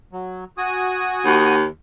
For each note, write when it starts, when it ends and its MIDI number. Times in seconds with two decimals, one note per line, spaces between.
0.13 0.45 54
0.58 1.55 66
0.58 1.55 80
0.58 1.55 87
1.26 1.66 39